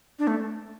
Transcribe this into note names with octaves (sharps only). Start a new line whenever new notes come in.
D4
A3